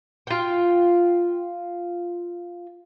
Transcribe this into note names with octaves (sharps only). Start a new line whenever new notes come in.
F4 G5